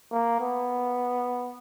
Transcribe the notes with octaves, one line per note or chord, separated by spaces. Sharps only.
A#3
B3